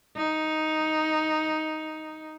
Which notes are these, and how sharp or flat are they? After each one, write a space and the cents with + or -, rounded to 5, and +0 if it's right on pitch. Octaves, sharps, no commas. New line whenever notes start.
D#4 +5